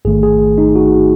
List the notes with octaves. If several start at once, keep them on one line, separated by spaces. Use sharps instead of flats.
A1 G#2 D#3 A3 G#4
G#4
D#4
F#4